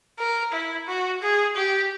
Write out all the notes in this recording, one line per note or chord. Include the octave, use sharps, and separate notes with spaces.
A#4
E4
F#4
G#4
G4